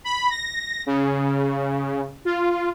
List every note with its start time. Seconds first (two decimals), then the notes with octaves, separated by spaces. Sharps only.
0.04 B5
0.30 A#6
0.86 C#3
2.25 F4